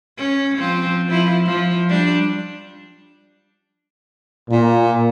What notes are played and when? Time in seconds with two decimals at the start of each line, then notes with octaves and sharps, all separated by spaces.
0.18 C#4
0.57 F3 C4 F4
1.08 F3 E4
1.45 F3
1.89 G3 D4
4.51 A#2